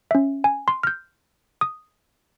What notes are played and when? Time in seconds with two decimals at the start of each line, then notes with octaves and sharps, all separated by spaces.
0.11 C#4 E5
0.44 G#5
0.68 C6
0.83 F6 G6
1.61 D#6